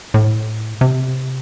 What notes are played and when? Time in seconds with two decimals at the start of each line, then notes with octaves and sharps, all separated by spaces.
0.14 A2
0.81 C3